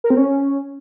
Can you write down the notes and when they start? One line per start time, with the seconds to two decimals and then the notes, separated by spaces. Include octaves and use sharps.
0.04 A#4
0.10 C4
0.17 C#4